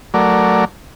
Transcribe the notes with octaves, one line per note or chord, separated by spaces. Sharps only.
F#3 A3 A#4 D5